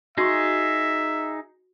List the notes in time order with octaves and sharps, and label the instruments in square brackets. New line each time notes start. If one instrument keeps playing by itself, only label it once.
[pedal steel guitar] D#4 G#4 [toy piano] F#4 C6 C#6 [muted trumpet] E5